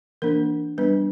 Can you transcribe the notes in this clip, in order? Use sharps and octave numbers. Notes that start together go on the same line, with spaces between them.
E3 A#3 D4 A#4
G3 B3 D4 B4